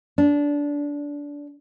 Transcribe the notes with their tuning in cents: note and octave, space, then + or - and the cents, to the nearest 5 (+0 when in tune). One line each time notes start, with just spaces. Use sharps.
D4 -20